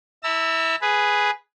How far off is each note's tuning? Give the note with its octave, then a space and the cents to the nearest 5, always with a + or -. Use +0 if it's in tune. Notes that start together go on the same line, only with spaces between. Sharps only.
E4 -20 A5 +45 E6 +5
G#4 +0 B4 +0